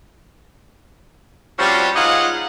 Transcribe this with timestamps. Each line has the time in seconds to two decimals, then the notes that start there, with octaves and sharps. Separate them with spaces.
1.59 F3 G3 C4 C#4 F#4 G4
1.96 G#3 D#4 F4 G#4 D#5 F#5